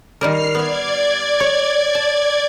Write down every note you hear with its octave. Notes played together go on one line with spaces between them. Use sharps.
D#3 G3 A#4 F6 C7
B3 D5 E5 G#6
C#5
A5